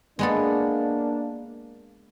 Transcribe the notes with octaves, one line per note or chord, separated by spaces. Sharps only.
G#3 A#3 B3 D4 A4